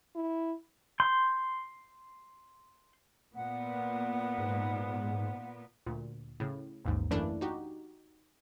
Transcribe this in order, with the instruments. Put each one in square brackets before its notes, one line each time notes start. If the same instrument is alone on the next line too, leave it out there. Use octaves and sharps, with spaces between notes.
[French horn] E4
[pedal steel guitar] C6 G6
[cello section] A#2 B3 [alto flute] F#5
[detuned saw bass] G#2
[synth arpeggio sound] D2 A#2
A2 C#3
A1 D#2 G#2
F#2 E3 A3 A#3 D4 E4
D#4 F#4 G4